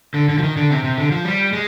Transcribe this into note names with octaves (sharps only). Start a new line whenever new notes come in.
D3
D3
F3
D#3
D3
C3
C3
D3
F3
G3
G#3